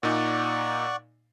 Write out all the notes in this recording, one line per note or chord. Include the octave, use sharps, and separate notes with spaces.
A#2 D#4 D5 F#5 C#6